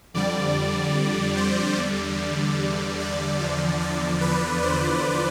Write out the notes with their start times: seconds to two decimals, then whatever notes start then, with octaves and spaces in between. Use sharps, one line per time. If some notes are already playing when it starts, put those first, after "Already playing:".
0.14 F2 D3 G3 D5
1.37 C5
1.77 E2 D3 G3 D5
3.00 D5
3.40 E2 D3 F3
3.81 D5
4.21 B4
4.62 C5